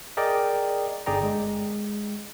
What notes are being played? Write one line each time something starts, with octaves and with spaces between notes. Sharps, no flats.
G#4 A#4 D5 D#5 G5
G1 D3 G#4 D5 G5 A#5
G#3